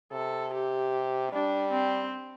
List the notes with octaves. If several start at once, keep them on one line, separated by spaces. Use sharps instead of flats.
C3 A4
G4
G3 D4
C4